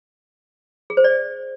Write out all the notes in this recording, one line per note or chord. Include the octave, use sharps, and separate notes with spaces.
G#4
C5
D5